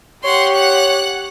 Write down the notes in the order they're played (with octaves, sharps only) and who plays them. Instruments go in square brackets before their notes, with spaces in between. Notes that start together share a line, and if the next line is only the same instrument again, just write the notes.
[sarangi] G4 [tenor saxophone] C#5 [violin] F#5 C6
[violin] F#5 F#6